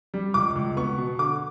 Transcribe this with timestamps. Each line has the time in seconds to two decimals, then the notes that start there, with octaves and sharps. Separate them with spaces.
0.14 G3
0.34 C#2 D6
0.56 C#2
0.77 B3 C#6
0.98 B2
1.19 D3 D6